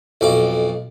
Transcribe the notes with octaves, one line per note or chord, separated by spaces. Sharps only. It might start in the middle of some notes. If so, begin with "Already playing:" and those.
B1 F2 D6